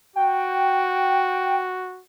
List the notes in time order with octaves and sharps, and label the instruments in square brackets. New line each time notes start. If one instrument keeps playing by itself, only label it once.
[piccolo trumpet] F#4 [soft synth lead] G5